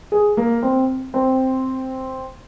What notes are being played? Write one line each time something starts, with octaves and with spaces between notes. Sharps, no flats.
G#4
A#3
C4
C4